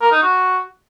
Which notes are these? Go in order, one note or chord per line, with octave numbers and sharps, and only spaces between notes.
A#4
D#4
F#4